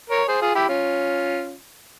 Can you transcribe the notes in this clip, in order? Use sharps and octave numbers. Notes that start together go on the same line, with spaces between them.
A#4 C#5
G#4 C5
F4 G#4
E4 G4
C#4 F4